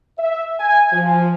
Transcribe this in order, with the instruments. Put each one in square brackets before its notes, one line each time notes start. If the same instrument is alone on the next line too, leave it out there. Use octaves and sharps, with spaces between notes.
[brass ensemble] E5
G#5
F3